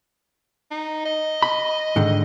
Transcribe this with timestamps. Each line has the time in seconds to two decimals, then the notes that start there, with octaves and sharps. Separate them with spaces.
0.71 D#4
1.05 D#5
1.43 B5
1.96 G#2 D3 D#3